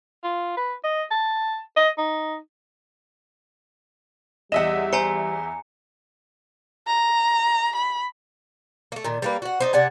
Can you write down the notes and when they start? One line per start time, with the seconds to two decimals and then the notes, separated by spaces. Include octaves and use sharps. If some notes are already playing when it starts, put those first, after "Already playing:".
0.24 F4
0.57 B4
0.84 D#5
1.11 A5
1.77 D#5
1.98 D#4
4.52 E2 G3 D#5 E5 F#5 E7
4.93 C5 G#5 A#5 C#7
6.87 A#5
7.76 B5
8.92 A3 A#3
9.04 A#2 D#3
9.22 G3 A#3 B4
9.42 F#4 F#5
9.60 D4 D#4 C5
9.73 C3 D5 F#5 G#5